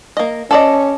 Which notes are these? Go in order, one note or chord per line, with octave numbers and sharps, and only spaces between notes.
A#3 D#5
C#4 A4 D5 D#5